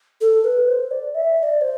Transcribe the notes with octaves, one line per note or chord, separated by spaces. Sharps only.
A4
B4
C5
D5
E5
E5
D5
C5